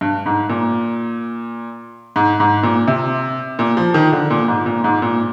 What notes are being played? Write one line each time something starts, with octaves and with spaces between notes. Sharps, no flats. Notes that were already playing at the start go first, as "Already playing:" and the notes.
G2
G#2
A#2
G#2
G#2
A#2
C3
A#2
F3
D#3
D3
A#2
G#2
A#2
G#2
A#2